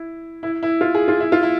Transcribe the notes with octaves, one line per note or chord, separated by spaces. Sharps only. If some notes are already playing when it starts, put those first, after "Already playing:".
Already playing: E4
E4
E4
F4
G#4
F4
E4
F4
E4